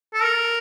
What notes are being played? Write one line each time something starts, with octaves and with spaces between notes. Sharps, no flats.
A4
A#4